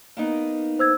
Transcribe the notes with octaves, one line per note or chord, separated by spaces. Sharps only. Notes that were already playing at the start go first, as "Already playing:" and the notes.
A#3 B3 D#4
C5 E6 G#6